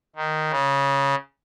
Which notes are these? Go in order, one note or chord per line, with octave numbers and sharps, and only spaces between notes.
D#3
C#3